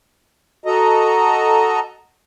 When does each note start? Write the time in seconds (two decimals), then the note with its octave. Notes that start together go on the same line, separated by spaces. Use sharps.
0.66 F#4 A4 D#5 A#5